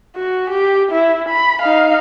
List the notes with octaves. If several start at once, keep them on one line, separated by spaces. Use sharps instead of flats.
F#4
G4
E4
B5
D#4 F5